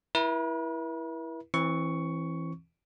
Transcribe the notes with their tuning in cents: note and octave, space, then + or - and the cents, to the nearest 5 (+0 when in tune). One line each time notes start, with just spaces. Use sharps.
E4 +0 B4 -45
E3 +0 C4 +30 C#6 +10